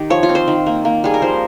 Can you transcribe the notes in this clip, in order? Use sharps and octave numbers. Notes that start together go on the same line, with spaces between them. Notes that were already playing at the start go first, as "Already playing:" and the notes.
Already playing: D#3 G4
F3 C#5
F4
C4
C5
D#3
A#3
A#3
G3 G#4
A#4
F3 C5